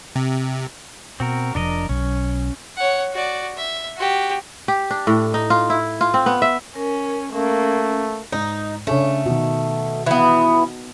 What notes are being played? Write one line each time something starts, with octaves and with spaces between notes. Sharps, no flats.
C3
B2 C4 F#4 A#4
F1 C3 F3 D4 A#4 D#5
B1 F#3 C#4
C#5 F#5
F#4 D5
E5
F#4 G4
G4
D4
A2
D#4
F4
E4
F4
C4
B3
E5
C#4 A#4
A3 A#3 C#4
G#2 D#4
C#3 A3 C#4 D4
B2 D#3
E3 B3